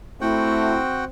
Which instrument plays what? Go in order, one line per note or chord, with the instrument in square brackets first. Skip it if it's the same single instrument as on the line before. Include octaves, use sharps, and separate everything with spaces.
[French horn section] A3 [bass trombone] C4 [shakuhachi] E4 [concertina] F#4 F#5 G5